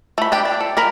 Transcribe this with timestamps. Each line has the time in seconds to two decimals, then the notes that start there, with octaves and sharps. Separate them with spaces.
0.18 A3 B5
0.32 D4 G4 G5
0.45 D4
0.61 A4
0.77 A#3 A#4 B5